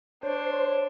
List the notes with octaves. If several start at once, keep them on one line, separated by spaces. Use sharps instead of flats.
D4 C5 C#5